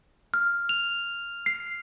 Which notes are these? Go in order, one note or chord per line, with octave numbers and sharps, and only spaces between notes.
F6
F7
C7